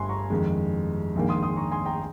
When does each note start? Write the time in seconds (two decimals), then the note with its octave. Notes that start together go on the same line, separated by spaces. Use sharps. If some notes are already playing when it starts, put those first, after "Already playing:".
Already playing: G1 G2 G#5 C6
0.09 A#5 C#6
0.30 F2 D#3 G#3
1.15 A#1 G#2 D#3 A#3
1.29 C6 D#6
1.43 C6 D#6
1.57 A#5 C#6
1.72 G#5 C6
1.85 G5 A#5